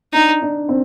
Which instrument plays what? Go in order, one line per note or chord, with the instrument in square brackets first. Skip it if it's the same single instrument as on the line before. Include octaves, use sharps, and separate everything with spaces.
[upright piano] D4 [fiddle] D#4
[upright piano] D4
C4